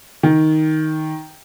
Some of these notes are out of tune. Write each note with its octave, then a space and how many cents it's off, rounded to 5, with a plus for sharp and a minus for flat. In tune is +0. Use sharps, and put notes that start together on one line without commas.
D#3 +10